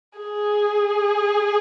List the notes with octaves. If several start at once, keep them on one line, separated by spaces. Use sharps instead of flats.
G#4